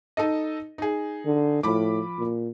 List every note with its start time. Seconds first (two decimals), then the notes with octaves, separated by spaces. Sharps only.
0.17 D#4 A4 D#5
0.78 D#4 G#4
1.26 D3
1.63 A2 F3 B5 D6
2.18 A#2